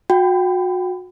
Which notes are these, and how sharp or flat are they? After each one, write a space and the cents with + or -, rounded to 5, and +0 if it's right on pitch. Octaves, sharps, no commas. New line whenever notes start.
F#4 -30 G5 +0 B5 +40